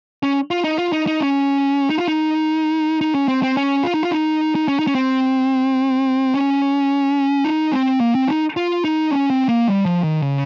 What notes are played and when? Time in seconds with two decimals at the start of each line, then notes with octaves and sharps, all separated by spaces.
0.23 C#4
0.51 F4
0.64 D#4
0.78 F4
0.92 D#4
1.07 D#4
1.20 C#4
1.90 D#4
1.98 F4
2.08 D#4
3.01 D#4
3.15 C#4
3.28 C4
3.43 C4
3.57 C#4
3.84 F4
3.94 D#4
4.03 F4
4.11 D#4
4.55 D#4
4.68 C#4
4.79 D#4
4.87 C#4
4.95 C4
6.35 C#4
7.45 D#4
7.72 C4
8.00 A#3
8.15 C4
8.28 D#4
8.57 F4
8.84 D#4
9.11 C#4
9.30 C4
9.49 A#3
9.68 G3
9.85 F3
10.04 D#3
10.22 C#3